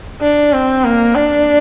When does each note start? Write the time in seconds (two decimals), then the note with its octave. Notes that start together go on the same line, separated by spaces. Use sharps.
0.21 D4
0.52 C4
0.84 A#3
1.15 D4